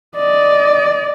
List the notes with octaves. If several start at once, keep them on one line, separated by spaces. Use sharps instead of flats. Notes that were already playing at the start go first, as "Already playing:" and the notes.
D5 D#5